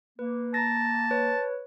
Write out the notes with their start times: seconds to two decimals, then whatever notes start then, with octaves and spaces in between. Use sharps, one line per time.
0.19 A#3 B4
0.54 A5 A#5 A#6
1.11 B4 C#5